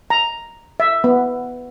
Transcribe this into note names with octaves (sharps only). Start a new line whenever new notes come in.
A#5
E5
B3